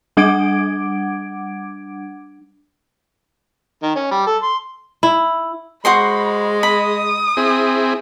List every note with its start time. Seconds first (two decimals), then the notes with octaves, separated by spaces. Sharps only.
0.17 G3 D4 F#5 D6 G#6 D7
3.83 D#3
3.95 C#4
4.11 G3
4.26 A4
4.42 C6
5.03 E4
5.85 G#3 F#4 C5 B5 C6
6.63 B5 D#6
7.37 C4 E4 G#4